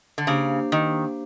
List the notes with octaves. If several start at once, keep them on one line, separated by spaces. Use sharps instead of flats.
D3
C#3 A#3 D4 G4 C5 F5
D#3